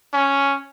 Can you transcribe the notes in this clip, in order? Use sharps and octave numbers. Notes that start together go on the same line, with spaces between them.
C#4